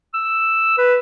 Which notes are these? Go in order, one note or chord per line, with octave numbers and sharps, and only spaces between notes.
E6
B4